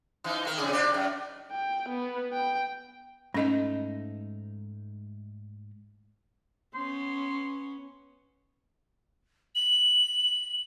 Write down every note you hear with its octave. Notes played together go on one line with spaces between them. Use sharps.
E3 D#4
D#3 A#4
F2 C#3 G#4
C3 D4 D5
F#2
G5
B3
G5
G#2 A3 C#4 D#4 D#5
B3 C#4 C6
F#7